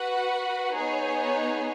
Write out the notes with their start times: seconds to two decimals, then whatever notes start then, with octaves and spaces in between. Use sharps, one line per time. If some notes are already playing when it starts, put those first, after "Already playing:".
Already playing: F#4 B4 F#5
0.75 B3 D#4 G#4 C#5